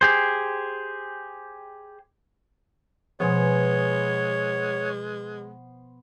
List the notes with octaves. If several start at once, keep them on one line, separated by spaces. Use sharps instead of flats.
G4 G#4 C5
B2 F3 G#3 B3 C5 C#5 G#5